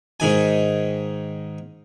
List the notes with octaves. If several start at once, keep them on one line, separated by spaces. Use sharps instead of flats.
G#2 D#3 G#5